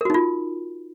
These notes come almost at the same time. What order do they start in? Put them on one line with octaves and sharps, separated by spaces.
A#4 F#4 D#4 F4